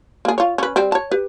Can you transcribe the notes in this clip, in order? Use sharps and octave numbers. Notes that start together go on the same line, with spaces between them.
A#3 G#4
F4 C#5
C#4 B4
G3 C4
C#5 A5
G4 B4